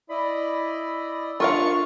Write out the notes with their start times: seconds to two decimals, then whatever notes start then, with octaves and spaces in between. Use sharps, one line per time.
0.10 E4 D5 D#5 B5
1.40 D4 F4 A#4 F5 C#6